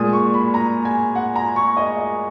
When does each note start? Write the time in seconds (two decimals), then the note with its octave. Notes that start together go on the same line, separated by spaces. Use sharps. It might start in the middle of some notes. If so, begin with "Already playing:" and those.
Already playing: A#2 G#3 D#6
0.13 C#6
0.34 B5
0.54 A#5
0.85 G#5
1.15 F#5
1.36 A#5
1.56 C#6
1.77 D#5
1.97 D#5